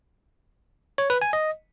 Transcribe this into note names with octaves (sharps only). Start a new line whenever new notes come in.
C#5
B4
G#5
D#5